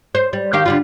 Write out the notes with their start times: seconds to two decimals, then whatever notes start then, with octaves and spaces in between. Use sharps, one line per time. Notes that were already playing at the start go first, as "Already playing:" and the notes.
0.15 C5
0.33 G3
0.53 D#3 G4 F5
0.66 D3 G3 F4